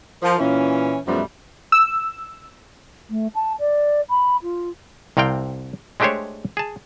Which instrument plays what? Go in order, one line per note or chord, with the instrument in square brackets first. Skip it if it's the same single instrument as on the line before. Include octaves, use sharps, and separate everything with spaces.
[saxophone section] F3 A#4
A#2 E3 C#4
F#2 B2 F3 G3 A3 B3
[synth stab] E6
[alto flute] A3
A5
D5
B5
F4
[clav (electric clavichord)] C2 C3 C4 F5 G5
G#3 A3 D4 G4 C5 C#5
G#4 A5